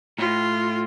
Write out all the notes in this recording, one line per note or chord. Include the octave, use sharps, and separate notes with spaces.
A2 F4